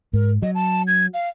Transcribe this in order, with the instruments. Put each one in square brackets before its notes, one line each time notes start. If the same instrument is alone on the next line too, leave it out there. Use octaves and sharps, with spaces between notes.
[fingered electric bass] G#2 [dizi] A#4
[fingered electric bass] F#3 [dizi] D#5
[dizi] A5
G#6
F5